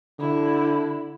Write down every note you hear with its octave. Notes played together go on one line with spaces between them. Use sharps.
D3 E4